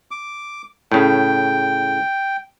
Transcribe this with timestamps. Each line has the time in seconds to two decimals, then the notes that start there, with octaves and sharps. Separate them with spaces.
0.11 D6
0.92 A2 C#3 G5